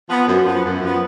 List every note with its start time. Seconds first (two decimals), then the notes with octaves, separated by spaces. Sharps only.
0.10 F3 B3
0.28 F#2
0.46 F3 B3
0.64 F#2
0.83 F3 B3